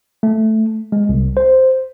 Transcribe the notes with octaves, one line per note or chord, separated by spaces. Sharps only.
A3
G#3
C2
C5